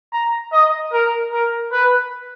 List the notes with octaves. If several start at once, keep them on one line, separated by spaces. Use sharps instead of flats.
A#5
D#5
A#4
A#4
B4